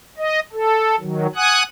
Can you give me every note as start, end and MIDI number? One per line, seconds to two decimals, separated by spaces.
0.18 0.40 75
0.53 0.96 69
1.00 1.27 51
1.00 1.27 54
1.35 1.63 78
1.35 1.63 80
1.35 1.63 87
1.35 1.63 90